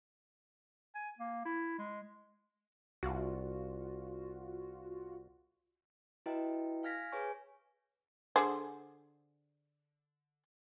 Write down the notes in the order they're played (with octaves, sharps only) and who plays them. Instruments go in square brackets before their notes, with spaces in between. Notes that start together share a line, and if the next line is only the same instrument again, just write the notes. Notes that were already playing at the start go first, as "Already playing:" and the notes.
[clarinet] G#5
A#3
E4
G#3
[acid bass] C2 [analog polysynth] F4 F#4
[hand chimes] E4 F#4 B4 D#5 E5 G5
F5 G#5 F6 G#6 A#6 B6
G#4 B4 C#5 G#5 C#6
[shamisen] D3 G#4 C5